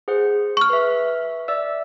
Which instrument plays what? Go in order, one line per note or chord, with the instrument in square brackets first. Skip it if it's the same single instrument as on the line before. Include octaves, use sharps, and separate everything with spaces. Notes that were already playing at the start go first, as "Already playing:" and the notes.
[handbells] G#4 C5 F#5
[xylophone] C#6 F6
[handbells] B4 E5
D5 E5 E6